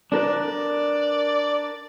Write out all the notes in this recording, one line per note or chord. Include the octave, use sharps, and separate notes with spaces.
D4 A#4 B4 D5